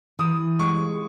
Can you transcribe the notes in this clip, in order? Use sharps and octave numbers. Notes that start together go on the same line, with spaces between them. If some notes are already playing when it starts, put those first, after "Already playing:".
E3 D#6
G#3 C#6